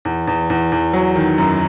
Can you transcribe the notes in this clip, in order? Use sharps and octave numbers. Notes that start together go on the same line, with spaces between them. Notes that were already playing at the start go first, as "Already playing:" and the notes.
E2
E2
E2
E2
F#3
D#3
F#2